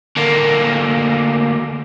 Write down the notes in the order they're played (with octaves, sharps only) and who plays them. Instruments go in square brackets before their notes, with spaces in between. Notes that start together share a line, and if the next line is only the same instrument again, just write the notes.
[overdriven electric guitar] D2 A#3